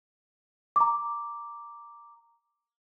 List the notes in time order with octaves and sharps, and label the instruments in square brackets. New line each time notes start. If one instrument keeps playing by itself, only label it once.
[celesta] A#5 D6